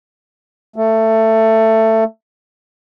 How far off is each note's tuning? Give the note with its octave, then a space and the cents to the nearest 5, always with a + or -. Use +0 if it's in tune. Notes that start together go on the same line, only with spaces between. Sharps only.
A3 +15